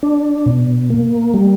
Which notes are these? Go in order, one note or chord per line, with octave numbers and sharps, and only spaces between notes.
D4
B2
A#3
G3